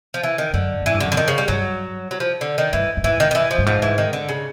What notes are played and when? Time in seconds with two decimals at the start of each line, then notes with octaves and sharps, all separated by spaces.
0.14 F3
0.23 E3
0.38 D#3
0.54 F#2 D3
0.82 G#2 E3
0.94 G2
1.00 D3
1.05 F#2
1.12 D3
1.16 F2 D#3
1.28 C#3
1.38 G3
1.48 G2 F#3
2.11 F#3
2.20 F3
2.41 D3
2.58 D#3
2.73 G2 E3
2.97 G2
3.04 G#2 E3
3.20 D#3
3.31 D#3
3.35 E3
3.51 F3
3.58 G2
3.66 G#2 F3
3.82 E3
3.98 D#3
4.13 D3
4.29 C#3